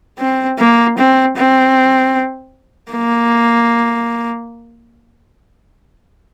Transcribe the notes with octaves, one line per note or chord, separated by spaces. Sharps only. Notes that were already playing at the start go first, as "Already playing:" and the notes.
C4
A#3
C4
C4
A#3